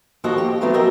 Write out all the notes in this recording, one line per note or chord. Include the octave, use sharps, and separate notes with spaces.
D#2 F3 G3 F#4 A4 D#5
G4
D#3 F3 F#3 A3 B3 C4
F#3 G3 A#4 D#5 E5 G5